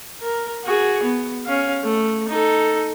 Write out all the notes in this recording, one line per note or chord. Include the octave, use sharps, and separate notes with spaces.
A#4
F#4 G#4
B3
C#4 F5
A3
D#4 A4